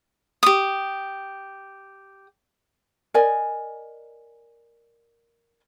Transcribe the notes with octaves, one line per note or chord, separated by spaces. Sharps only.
G4 D#6
A#4 D5 D#5 G#5